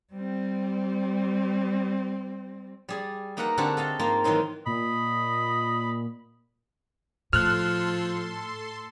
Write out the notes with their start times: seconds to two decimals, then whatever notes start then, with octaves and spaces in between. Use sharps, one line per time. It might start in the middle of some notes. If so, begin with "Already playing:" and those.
0.13 G3 C4
2.89 G3 G#4 D5
3.37 A#3 D#4 A#4 B4 F#5 A#5
3.58 D3 C4 F#4 G4 A4 A5
3.77 A4 D#5 F5 A5
3.99 G#2 A#3 F4 F5 G5 A#5
4.24 D#3 E3 F#3 D#4 C5
4.66 A#2 D#5 B5
7.33 A2 F3 A4 C6 F6 F#6